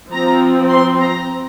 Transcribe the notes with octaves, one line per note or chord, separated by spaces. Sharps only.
F3 C4 A#5
C6
A#5